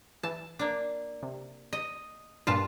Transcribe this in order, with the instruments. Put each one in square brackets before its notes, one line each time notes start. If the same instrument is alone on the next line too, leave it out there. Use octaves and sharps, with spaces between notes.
[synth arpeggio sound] E3 [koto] A5
[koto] A#3 D4
[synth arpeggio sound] C3
[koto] D#5
[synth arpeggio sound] G2 A#2 D4 [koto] F4 A5